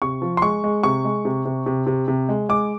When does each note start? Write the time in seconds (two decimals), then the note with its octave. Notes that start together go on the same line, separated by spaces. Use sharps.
0.02 C3 C#6
0.22 F3
0.37 C6
0.42 G#3 C#6
0.64 G#3
0.83 C3 C#6
1.05 G#3
1.25 C3
1.45 C3
1.66 C3
1.87 C3
2.08 C3
2.29 G#3
2.49 G#3 D6